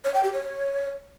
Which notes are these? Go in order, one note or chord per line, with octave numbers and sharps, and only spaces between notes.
C#5
G5
G4
C#5